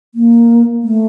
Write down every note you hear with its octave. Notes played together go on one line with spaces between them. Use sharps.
A#3
A3